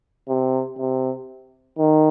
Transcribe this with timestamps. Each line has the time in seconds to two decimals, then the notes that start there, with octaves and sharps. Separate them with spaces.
0.29 C3
0.79 C3
1.78 D#3